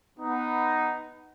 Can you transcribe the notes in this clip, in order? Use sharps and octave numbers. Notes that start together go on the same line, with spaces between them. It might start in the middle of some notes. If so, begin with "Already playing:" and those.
B3 D#4